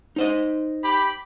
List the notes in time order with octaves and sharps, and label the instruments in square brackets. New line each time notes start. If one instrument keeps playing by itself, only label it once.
[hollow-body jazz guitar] D#4 C5 D#5
[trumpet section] G4 B5